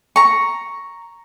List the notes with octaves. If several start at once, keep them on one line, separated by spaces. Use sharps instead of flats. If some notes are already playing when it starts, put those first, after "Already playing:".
A#5 C#6